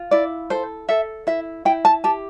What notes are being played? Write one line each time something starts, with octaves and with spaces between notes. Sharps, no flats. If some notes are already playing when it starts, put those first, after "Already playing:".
Already playing: F4
E4 D5
A4 C5
A4 E5
E4 E5
E4 G5
A5
G4 A5